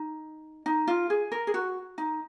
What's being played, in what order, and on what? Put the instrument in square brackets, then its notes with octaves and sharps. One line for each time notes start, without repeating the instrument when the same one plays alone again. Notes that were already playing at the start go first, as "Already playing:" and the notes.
Already playing: [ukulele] D#4
D#4
F4
G#4
A#4
G#4
F#4
D#4